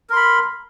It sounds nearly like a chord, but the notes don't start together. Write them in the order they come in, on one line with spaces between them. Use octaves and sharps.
A#4 C6 B5